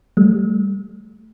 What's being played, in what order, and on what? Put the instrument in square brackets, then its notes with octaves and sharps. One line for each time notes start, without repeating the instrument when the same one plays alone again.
[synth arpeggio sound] G3 A3